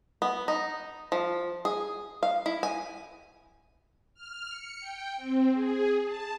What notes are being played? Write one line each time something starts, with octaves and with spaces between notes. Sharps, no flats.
B3
D#4
F3
G#4
F5
E4
G#5
F6
C#7
G5
C4
G#4
A5